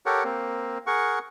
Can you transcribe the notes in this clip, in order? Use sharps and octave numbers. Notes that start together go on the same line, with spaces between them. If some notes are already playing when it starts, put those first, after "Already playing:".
G4 A4 A#4 C#5 F#5
A#3 C4
G#4 A#4 F#5 C#6